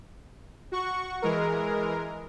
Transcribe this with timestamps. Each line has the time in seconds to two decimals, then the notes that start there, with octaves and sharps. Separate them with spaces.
0.72 F#4 F#5 C#6
1.22 E3 G#3 A#4